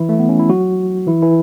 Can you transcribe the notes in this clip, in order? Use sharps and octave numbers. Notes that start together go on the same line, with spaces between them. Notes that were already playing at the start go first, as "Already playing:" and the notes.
Already playing: E3 E4
A3
B3
C#4
E4
F#3 F#4
E3 E4
E3 E4